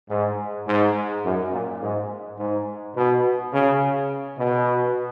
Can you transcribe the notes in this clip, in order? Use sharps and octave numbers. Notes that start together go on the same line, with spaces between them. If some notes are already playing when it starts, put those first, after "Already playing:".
G#2
G#2
F#2
A#2
G#2
G#2
B2
C#3
B2